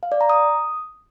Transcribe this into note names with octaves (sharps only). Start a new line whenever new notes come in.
F5
D5
A#5
D#6